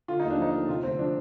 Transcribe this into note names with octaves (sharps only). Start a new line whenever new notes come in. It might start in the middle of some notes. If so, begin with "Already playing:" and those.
D3 F4
D#2 D#4
D4
F3 D#4
A3
C3 F4
D2 C4
F3 D4